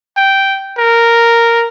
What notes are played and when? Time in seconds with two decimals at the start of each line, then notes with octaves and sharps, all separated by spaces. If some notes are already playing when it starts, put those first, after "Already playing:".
0.17 G5
0.78 A#4